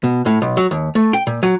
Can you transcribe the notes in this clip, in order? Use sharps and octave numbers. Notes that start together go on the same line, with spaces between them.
B2
A2
B1
F#3
D#2
A3
G5
A#2
F#3